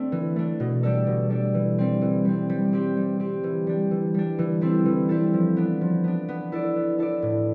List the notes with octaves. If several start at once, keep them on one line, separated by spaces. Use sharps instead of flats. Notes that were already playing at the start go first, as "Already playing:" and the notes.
Already playing: A3 C4 D4
E3
A3 D4
B2
G3 D4 A4 D5
B2
G3 D4 A4 D5
E3
G3 C4
E3
G3 C4
G3
C4 G4
G3
C4 G4
E3
G3 D4
E3
G3 D4
E3
G3 C4 E4 A4
E3
G3 C4 E4 A4
F3
B3 D4
F3
B3 D4
B3
E4 A4 D5
B3
E4 A4 D5
A2